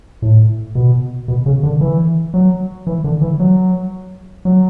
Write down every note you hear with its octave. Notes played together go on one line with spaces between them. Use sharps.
A2
B2
B2
C#3
D3
E3
F#3
E3
D3
E3
F#3
F#3